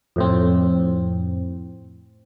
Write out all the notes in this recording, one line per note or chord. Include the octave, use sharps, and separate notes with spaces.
F2 A2 C4